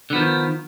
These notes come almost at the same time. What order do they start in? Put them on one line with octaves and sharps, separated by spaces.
D3 B3 F3 D#3